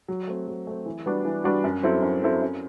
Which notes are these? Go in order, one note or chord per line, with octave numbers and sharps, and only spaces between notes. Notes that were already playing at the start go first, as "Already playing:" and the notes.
F#3
A3 C4
F#3
A3 C4
E3
G3 B3 D4 F#4
E3
G3 B3 D4 F#4
F#2
F#3 C4 E4 A4
F#2
F#3 C4 E4 A4
F#2